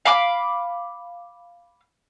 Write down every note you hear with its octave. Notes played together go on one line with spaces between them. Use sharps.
F5 B5 D6